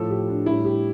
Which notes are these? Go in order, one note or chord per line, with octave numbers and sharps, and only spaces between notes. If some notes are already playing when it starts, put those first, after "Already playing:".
Already playing: A2 F3 A4
G4
D4
A2 G3 E4
G4